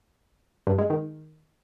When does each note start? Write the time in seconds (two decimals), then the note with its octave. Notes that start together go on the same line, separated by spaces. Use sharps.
0.67 G2
0.78 G#3
0.90 D#3